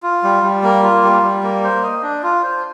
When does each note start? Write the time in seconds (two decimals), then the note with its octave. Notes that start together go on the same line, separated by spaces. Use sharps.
0.03 F4
0.23 G3
0.43 G3
0.63 A#3
0.83 F4
1.03 G3
1.23 G3
1.43 A#3
1.64 C5
1.83 D#5
2.03 D4
2.23 F4
2.43 C5